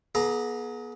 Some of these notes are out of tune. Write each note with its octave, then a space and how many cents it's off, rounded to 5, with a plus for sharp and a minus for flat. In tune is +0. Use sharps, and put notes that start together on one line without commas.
B3 -35 G#4 +30 A#5 +0